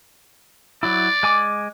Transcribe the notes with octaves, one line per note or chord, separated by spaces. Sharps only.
F#3 E4 D5
G#3 G#5 D6